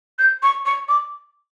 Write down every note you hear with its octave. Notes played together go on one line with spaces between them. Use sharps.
G6
C#6
C#6
D6